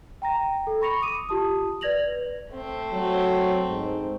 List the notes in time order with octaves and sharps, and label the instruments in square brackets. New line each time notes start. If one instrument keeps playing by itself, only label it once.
[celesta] G5 A#5 A#6
A4
B5 C#6 A#6 C#7 F7
D6 D#6 D#7
F4 G4 A5 D#6
B4 D5 G#6 A#6 F7 F#7
[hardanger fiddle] A3 C4
[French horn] F#3
G#2